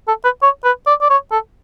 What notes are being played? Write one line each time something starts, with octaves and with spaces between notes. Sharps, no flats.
A4
B4
C#5
B4
D5
D5
C#5
A4